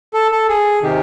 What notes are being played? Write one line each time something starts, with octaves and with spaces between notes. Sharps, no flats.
A4
A4
G#4
C3 D#3 G4